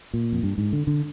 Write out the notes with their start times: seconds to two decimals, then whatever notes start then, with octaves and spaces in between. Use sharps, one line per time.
0.14 A#2
0.32 F2
0.43 G2
0.58 G#2
0.73 D3
0.87 D3